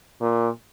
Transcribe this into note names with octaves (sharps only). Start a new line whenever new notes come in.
A#2